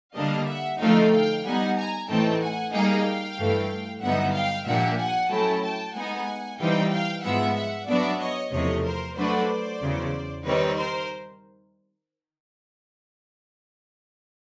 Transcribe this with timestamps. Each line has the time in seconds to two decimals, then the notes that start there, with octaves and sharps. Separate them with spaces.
0.16 D3 G3 A#3 D4 D#5 F5
0.48 E5 F#5
0.80 D3 F3 A3 C4 D#4 F5 G5
1.13 F5 G5
1.45 G3 B3 D#4 F#5 G#5
1.77 G#5 A#5
2.09 A2 E3 A3 C4 D#4 G5 A5
2.41 F#5 G#5
2.73 G3 A#3 D#4 G#4 F5 G5
3.38 G2 E3 A3
4.02 G2 D3 F#3 B3 D#4 E5 F#5
4.34 F5 G5
4.66 A#2 F3 A#3 D4 G4 E5 F#5
4.98 F#5 G#5
5.30 F#3 A3 C#4 E4 G5 A5
5.63 G5 A5
5.95 G#3 B3 D#4 F#5 G#5
6.59 E3 G3 C4 D#4 F5 G5
6.92 F5 G5
7.24 G#2 F3 G#3 B3 E5 F#5
7.56 E5 F#5
7.88 F#3 B3 D4 F#4 D5 E5
8.20 C#5 D#5
8.52 E2 C3 F3 A3 C#5 D#5
8.84 A#4 C5
9.17 F#3 A3 D4 F#4 B4 C5 D5
9.82 E2 C#3 F#3
10.45 D#3 G3 C4 D#4 B4 C#5
10.78 A#4 C5